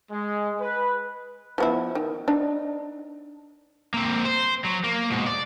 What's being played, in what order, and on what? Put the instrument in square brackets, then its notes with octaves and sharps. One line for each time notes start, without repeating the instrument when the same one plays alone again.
[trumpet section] G#3
B4
[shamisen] F3 B3 E4
D#3
D4 D#4
[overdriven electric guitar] A#3 C4
C5
F#3
A#3
G#2 B2
D5